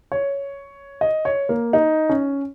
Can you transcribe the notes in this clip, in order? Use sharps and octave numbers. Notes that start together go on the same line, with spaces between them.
C#5
D#5
C#5
A#3
D#4
C#4